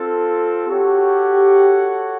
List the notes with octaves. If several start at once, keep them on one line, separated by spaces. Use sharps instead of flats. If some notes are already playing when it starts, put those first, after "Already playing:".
Already playing: C4 F4 A4
F#4 G4 A4 C#5 F#5